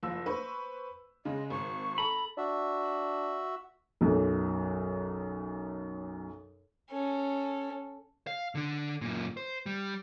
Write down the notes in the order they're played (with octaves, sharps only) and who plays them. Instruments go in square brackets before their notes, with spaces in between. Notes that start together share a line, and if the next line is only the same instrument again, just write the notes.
[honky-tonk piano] F#1 F3 E6
B4 C5 C#6
[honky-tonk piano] C#3 G#3 [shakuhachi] D#5
[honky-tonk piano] G#1 [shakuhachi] C#6
[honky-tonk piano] A4 A#5 [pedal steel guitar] B5
[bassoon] D4 [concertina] F#4 E5
[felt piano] B1 F#2
[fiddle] C#4 A4
[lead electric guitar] F5
D3 D4
F#2 A#2
C5
G3